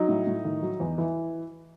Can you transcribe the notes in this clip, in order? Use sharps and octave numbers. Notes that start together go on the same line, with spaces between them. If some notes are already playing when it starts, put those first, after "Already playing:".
Already playing: F#3 D#4
A2
A2
D#3
F#3
E2
E3